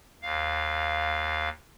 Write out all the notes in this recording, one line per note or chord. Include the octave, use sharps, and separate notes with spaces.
D#2 F5